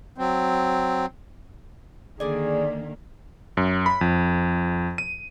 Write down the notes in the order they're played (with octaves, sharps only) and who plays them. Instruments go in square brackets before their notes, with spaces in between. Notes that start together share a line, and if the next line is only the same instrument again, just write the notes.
[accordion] F#3 C4
[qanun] D3 G#5 [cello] D#3 A#3 [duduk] G#4 [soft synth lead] D5
[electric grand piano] F#2
B5
F2
D#7